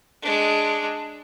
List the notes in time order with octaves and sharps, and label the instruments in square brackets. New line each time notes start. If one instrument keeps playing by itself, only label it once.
[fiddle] G#3 D4